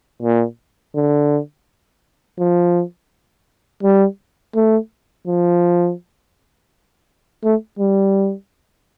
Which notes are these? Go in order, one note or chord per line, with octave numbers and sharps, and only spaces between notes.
A#2
D3
F3
G3
A3
F3
A3
G3